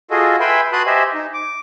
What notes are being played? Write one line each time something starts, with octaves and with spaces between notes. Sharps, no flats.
F4 F#4 G#4 A4 D#5
B4 E5 G5 G#5 B5 C6
F#4 B4 A5 C6 D#6 F#6
G4 C5 D#5 E5 G#5
D#4
D6